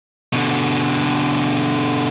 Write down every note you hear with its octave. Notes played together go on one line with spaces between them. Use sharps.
B2 D3